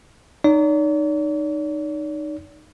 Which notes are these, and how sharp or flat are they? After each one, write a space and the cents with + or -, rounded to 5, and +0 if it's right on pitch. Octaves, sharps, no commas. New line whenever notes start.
D#4 -20 D5 -45